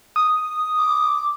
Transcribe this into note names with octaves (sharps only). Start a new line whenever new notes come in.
D#6
D6